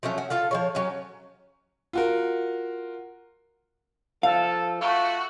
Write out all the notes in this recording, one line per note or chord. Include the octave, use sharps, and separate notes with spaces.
F3 F#3 A3 C#4
F#4
F4 A4 F5
F3 G#3 C#5
F#3 C#4
F4 F#4 A#4
F3 A4 F5
A3 F4 F#4